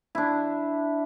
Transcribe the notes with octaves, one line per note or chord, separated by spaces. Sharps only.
D4 E4